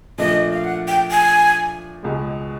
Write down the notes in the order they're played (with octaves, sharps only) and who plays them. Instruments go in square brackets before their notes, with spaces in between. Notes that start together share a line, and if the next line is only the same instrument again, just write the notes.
[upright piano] A#2 F3 A3 D4 [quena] D#5
[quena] F5
F#5
G5
G#5
[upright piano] C#2 B2 G#3